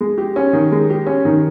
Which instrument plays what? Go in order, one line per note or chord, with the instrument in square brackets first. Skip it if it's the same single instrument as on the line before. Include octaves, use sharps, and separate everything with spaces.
[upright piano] G#3
G4
C#4
D#3
G#3
G4
C#4
D#3